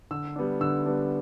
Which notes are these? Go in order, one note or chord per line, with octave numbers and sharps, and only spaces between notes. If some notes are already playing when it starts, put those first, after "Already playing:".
D3 E6
G3 B3 D4
D3 E6
G3 B3 D4